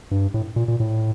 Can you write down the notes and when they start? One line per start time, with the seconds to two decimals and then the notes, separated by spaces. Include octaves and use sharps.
0.11 G2
0.34 A2
0.56 A#2
0.68 A#2
0.80 A2